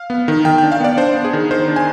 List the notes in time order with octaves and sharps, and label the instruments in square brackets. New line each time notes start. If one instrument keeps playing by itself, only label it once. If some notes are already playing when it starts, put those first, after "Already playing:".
Already playing: [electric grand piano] F5
B3
D#3
D#3 G5
G5
D4
F5
B3 D5
D4 C5
B3
G#4
D#3
D#3 C5
D4
G#5